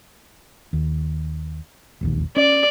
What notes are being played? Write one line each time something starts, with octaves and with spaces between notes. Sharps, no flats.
D#2
E1 A#1 D#2
C#4 D5